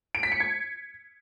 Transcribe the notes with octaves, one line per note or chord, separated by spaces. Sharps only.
D7
B6
C#7
G#6